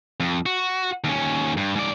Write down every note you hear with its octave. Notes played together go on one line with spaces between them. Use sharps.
F2
F#4
D#2 C#4
G2
G#2 D5